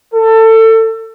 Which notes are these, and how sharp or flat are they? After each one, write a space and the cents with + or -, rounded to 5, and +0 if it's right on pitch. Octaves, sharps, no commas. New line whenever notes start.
A4 +25